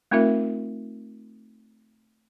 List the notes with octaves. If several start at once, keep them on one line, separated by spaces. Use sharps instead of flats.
A3 C4 D#4 F4 A#4 E5